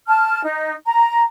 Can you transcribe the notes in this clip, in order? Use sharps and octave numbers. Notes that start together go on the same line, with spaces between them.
A5 F6
D#4
A#5